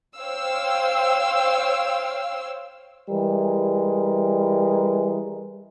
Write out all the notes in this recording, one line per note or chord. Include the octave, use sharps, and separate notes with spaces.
C5 C#5 F5 G5 E6
E3 G3 G#3 A#4